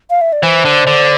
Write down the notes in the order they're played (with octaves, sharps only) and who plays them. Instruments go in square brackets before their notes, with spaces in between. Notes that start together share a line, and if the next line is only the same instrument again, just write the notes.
[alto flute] F5
E5
D5
[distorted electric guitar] E3 [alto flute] C5
[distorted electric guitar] D3
D3